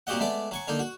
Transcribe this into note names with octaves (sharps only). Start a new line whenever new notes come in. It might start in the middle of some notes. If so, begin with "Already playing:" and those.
A#2 C4 F#4 G4 D#5 F#5
G#3 A3 B3 D5
F#3 G#5 C#6
D3 A#3 D#4
F#4